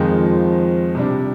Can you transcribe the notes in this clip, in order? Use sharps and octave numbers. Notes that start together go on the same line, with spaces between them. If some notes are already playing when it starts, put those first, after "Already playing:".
Already playing: F2 D#3 F3 G#3 D#4
C3 G3 D4